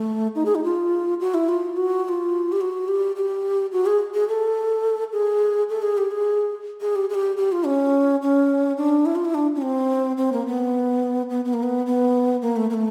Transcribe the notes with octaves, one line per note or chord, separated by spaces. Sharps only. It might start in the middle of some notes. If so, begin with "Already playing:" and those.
Already playing: A3
D#4
G#4
D#4
F4
F#4
E4
F4
F#4
F#4
F4
G4
F#4
G4
G4
F#4
G#4
G#4
A4
G#4
A4
G#4
G4
G#4
G#4
G4
G#4
G4
G4
F4
C#4
C#4
D4
E4
F4
E4
D4
C#4
C4
C4
A#3
B3
B3
B3
A#3
B3
B3
A#3
A3
A#3
A3